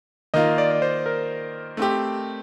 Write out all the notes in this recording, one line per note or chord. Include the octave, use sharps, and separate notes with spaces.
D#3 A#3 F4 D#5
D5
D5
C5
A#4
A3 C4 G4